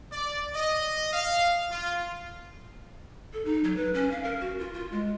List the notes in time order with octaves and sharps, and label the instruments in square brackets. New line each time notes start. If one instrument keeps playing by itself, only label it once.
[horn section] D5
D#5
F5
F4
[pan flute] A4
D#4
F#3
B4
C#4
F5
A#4
F#4
F4
F4
G#3